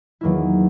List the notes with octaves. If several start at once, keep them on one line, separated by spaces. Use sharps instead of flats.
E2 D#3 F#3 A#3 E4